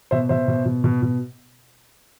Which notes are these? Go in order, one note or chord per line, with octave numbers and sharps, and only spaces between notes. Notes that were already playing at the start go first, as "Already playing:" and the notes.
B2 C5 E5
B2 C5 E5
B2
B2
B2
B2